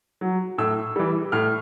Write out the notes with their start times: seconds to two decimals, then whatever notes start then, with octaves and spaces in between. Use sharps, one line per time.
0.21 F#3
0.58 A2 E6
0.96 E3 G3
1.32 A2 F6